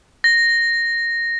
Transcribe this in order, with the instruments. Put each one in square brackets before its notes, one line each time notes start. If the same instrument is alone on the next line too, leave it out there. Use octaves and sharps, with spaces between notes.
[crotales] A#6